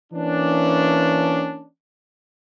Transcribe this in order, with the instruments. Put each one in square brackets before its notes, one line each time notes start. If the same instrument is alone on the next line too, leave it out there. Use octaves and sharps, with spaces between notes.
[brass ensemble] E3 A#3 C#4 D4